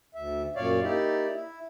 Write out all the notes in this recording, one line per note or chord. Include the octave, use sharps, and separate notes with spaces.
D2 E5
F#2 A#2 C#5 D5 F5
A#3 D#4 E4 G4 D5
E4